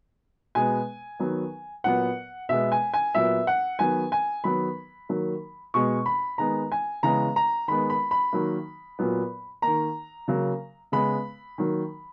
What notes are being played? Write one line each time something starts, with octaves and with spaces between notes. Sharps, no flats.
B2 G#3 B3 G#5
D#3 F#3 B3
A#2 F#3 B3 F#5
B2 G#3 B3 E5
G#5
G#5
A#2 F#3 B3 E5
F#5
D#3 F#3 B3 G#5
G#5
D#3 F#3 B3 B5
D#3 F#3 A#3
B2 G#3 B3 C#6
B5
D#3 G#3 B3 A#5
G#5
C#3 E3 G#3 B3 A#5
A#5
D#3 G#3 B3 B5
B5
B5
D#3 F#3 A#3
A#2 F#3 B3
D#3 A#3 A#5
C#3 F#3 A#3
C#3 G#3 B3 B5
D#3 F#3 A#3